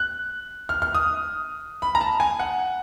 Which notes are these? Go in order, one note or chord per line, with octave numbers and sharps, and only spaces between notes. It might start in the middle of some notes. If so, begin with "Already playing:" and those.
Already playing: F#6
F6
F6
D#6
B5
A#5
A5
G#5
F#5